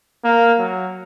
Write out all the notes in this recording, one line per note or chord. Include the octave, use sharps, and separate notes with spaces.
A#3
F#3